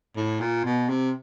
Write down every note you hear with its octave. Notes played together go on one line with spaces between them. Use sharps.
A2
A#2
B2
C3